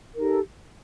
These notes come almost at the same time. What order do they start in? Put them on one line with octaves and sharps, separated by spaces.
A#4 D#4 G4 A4